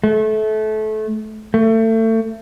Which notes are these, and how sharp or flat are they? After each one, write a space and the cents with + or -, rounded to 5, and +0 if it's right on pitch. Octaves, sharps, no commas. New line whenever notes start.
A3 -25
A3 +30